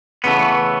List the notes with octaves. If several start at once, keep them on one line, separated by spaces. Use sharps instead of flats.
C#3 E3 A3 B3